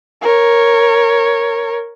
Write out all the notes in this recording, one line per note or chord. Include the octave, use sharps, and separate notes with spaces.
A#4 C#5